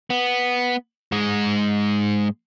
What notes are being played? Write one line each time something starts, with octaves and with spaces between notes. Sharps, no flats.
B3
G#2 G#3